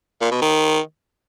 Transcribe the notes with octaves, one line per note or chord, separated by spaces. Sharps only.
A#2
B2
D#3